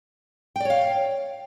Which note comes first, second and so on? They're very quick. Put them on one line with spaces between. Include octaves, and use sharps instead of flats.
G5 D5 C#5 F5